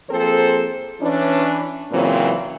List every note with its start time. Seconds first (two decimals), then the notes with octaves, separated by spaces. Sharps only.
0.10 F3 A#3 C4 G#4 A4 C5
1.00 E3 C#4 D4
1.91 A#2 C#3 E3 F#3 C4